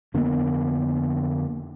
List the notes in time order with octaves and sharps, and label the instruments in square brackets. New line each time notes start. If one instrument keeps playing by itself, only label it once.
[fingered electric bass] F2 D3 A#3 B3